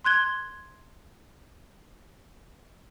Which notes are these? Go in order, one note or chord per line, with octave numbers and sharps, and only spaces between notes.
C6 F#6 G#6 G7